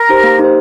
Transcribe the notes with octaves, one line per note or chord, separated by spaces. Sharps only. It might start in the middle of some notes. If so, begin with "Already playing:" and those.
Already playing: A#4
D#4 G4 C5
A#3
D#4 G4 C5